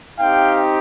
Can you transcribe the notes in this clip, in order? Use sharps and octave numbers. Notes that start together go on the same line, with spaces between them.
C4 D#4 G4 F5 G5